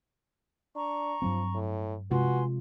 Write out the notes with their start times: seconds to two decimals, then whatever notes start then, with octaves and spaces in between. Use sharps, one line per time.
0.76 D4 A#5 C#6
1.22 G2 F3 F#3 C4
1.55 A2
2.11 C3 G#3 F4 F#4 B4 G#5 C6